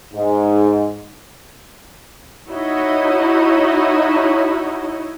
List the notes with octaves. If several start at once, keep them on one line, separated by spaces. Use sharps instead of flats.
G#2
D#4 E4 F#4 C#5 D#5